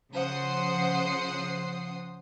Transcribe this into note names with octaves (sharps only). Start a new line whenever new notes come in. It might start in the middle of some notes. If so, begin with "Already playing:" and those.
C#3 F3 C5 F#5 D#6 C7